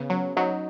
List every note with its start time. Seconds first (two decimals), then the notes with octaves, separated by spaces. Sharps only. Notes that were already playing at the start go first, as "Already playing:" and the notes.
Already playing: C#3 B3
0.10 F#3 C#4
0.37 F#3 D#4